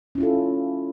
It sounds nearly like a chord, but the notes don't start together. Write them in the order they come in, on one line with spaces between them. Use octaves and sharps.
C#4 E4 F4 A4